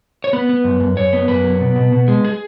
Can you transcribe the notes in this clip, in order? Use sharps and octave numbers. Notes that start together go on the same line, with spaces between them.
C#5
B3 B4
B3
F#2
F#2
F#2 C#5
B3
F#2 B4
F#3
B2
B2
B2
G#3
G#4